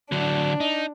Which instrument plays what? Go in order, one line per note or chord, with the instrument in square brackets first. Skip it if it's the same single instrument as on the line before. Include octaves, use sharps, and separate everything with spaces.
[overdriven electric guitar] D3 F#3 [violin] D4
[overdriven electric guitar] D#4